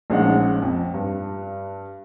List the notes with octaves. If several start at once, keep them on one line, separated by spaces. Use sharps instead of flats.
A#1 G#3 C#4 D#4 F#5
F2
G2